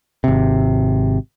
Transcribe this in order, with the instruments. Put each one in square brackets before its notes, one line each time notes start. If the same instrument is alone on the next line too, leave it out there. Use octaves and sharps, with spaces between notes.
[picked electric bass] G#1 C3